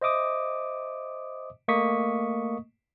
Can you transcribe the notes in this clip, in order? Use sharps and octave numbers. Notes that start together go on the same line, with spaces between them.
C5 D#5 E5 D6 D#6
A3 A#3 D#5 C#6 D#6 B6